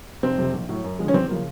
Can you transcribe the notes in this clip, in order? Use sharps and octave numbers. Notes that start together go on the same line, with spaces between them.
F1 C4
F2 C3
A#1
A2 F#3
F#2
D3 F3 G#3
C#4
E2 C4
C#3 F3 A#3